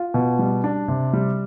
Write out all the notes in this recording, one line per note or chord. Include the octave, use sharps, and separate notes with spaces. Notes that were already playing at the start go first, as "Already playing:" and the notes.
Already playing: F4
B2
G3
D4
C3
G3